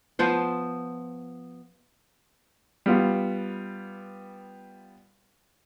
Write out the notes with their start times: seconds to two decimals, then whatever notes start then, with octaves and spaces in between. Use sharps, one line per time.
0.19 F3 B3 C5
2.86 G3 B3 F4